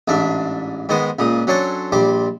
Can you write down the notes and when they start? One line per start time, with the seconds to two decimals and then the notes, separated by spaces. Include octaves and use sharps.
0.08 A1 G#2 D4 E5
0.89 G#2 D#3 G#3 B3 C5
1.19 C#2 A#2 D#6
1.47 F#3 C#4 D4 A4 C5
1.92 A#1 G3 C5 D6